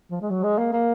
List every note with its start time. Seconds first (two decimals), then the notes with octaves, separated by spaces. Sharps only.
0.11 F3
0.22 G#3
0.30 F#3
0.43 G#3
0.59 A#3
0.73 A#3